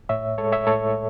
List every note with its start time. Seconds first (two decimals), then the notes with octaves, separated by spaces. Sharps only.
0.09 A2 C#5 E5
0.38 G#3 A4 C#5
0.52 C#5 E5
0.67 A2 A4 C#5